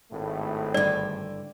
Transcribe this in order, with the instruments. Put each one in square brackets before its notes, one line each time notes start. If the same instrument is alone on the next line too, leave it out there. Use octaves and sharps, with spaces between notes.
[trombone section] G#1 A2 A3
[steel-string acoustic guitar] G2 D3 [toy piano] D5